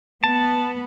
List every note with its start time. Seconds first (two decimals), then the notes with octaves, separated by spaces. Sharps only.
0.24 B3 A5